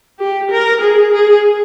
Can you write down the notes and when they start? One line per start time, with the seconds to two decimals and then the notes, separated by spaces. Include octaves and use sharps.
0.19 G4
0.51 A#4
0.81 G#4
1.12 G#4